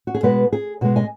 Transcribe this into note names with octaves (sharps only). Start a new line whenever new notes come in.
F#4
G#4
B2 G#3 B3 F#4 B4
G#4
B2 G#3 B3 F#4
D#5 G#5